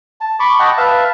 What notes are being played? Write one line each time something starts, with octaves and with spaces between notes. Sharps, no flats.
A5
B5 C#6 D6
D#5 F#5 G5 A5
B4 E5 F5 A5